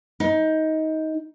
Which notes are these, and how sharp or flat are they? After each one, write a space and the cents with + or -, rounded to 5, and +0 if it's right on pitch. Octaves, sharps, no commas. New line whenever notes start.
D#4 +20